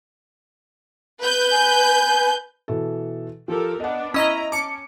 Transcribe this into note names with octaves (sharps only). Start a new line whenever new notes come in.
B4 G6
G#5
B2 E3 A4
F3 G4 A4 A#4
B3 D4 D#5 F#5
C#4 E4 D#5 A#5 B5 D#6 E6 B6
C#4 A5 D6 C#7